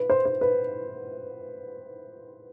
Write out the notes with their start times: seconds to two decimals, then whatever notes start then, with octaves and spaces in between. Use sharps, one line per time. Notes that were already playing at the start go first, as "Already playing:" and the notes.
Already playing: B4
0.10 C5
0.26 C5
0.41 B4